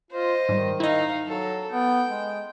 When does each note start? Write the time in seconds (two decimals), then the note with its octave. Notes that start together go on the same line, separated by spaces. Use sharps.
0.11 F4 C5 D#5
0.49 G#2 D#3 G3
0.80 D#4 E4 D#5 F5
1.27 F#3 A4
1.71 B3 G5
2.07 G#3